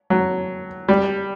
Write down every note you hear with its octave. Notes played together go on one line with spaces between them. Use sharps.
F#3
G3